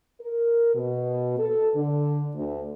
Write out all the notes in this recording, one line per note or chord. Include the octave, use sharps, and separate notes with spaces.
A#4
B2
A4
D3
D2